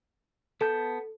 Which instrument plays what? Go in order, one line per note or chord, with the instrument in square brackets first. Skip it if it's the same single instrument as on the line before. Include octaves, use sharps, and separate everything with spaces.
[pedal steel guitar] B3 A5 G6 [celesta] A4